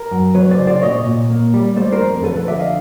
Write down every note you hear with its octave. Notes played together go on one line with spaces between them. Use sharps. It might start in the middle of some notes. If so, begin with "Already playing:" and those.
Already playing: A#4
F#2
F#3 B4 C#5
C5 D5
C#3
C5 D5
A#2 C#5 D#5
A#2
A#3
G3
A3 C5 D5
A#4 C5
F2
F3 A4 B4
A4 B4
D3 D5 E5
D#5 F5